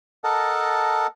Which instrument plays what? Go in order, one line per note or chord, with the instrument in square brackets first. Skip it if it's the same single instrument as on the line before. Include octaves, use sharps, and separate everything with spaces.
[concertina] A4 A#4 D#5 F#5 A5